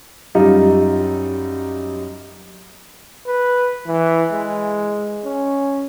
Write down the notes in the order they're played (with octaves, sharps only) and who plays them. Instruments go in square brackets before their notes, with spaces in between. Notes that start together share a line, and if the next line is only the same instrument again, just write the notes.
[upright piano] F#2 G3 D#4 F4
[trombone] B4
E3
G#3
C#4